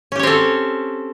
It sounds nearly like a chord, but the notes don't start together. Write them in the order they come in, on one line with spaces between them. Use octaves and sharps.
C#4 G4 C#5 C4 A4